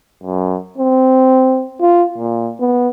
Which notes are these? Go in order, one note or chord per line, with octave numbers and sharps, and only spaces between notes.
F#2
C4
F4
A#2
B3